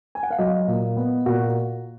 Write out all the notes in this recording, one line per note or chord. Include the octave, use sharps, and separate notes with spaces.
G#5
F#5
F5
F#3 D#5
A#2
B3
A#2 F#4